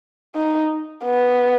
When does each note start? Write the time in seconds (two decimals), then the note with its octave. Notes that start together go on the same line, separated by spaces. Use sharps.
0.35 D#4
1.04 B3